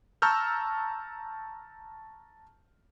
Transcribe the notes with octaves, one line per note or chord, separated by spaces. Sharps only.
A5 A#5 C#6 E6 F6 G6